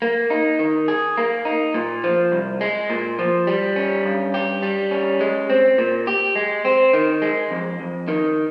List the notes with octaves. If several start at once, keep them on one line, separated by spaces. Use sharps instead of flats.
A#3
D#4
D#3
G#4
A#3
D#4
A#2
F3
C2
G#3
A#2
F3
G3
C#4
G2
G4
G3
C#4
G#3
C4
A#2
G4
G#3
C4
D#3
G#3
F2
F2
D#3